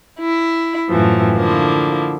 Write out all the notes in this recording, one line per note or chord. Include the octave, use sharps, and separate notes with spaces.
E4
F#2 A2 E3 F3
D3 F3 A#3 E4